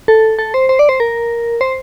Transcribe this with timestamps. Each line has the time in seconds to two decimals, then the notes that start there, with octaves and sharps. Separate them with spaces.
0.08 A4
0.39 A4
0.54 C5
0.69 C5
0.79 D5
0.89 C5
1.00 A#4
1.61 C5